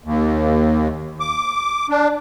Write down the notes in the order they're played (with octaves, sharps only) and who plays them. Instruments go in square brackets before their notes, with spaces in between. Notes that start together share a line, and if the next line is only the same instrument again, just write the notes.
[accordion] D#2
D6
D4